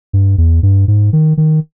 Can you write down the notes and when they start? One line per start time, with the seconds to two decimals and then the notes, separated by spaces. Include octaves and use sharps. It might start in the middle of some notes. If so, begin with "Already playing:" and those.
0.13 G2
0.38 E2
0.63 G2
0.88 G#2
1.13 D#3
1.37 D#3